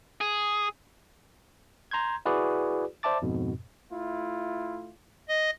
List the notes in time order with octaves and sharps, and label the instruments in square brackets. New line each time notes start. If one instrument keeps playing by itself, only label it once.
[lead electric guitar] G#4
[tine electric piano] A#5 C6 G6 G#6
E4 F#4 G#4 B4 D5
C5 D5 E5 A5 D6 A6
F2 G#2 B2
[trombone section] A3 E4 F4
[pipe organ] D#5